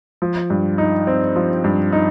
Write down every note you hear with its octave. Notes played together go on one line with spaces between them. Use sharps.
F3
G2
D#4
C4
F3
G2
D#4